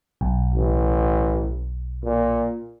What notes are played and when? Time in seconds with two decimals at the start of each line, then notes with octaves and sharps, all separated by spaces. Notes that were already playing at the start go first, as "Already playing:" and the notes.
0.21 B1
0.54 A1
2.03 A#2